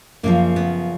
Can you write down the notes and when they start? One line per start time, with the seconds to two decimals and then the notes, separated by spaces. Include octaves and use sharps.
0.23 F#2 C#3 F3 A#3
0.56 B3